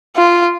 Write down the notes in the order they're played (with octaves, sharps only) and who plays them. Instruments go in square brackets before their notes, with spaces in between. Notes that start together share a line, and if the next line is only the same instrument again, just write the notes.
[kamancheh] F4